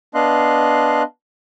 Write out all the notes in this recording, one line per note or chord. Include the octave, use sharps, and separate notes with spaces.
B3 D4 D#5 F5 C6 F#6